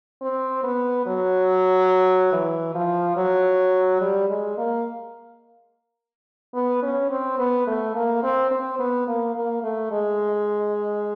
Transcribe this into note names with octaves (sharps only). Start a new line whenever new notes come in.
C4
B3
F#3
E3
F3
F#3
G3
G#3
A#3
B3
C#4
C4
B3
A3
A#3
C4
C4
B3
A#3
A#3
A3
G#3